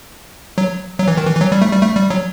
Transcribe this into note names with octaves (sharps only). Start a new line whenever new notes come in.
F#3
F#3
E3
D#3
E3
E3
F#3
G3
A3
G3
A3
G3
F#3